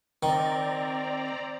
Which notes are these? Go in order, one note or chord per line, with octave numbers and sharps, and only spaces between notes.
D#3 C4 D5 A#5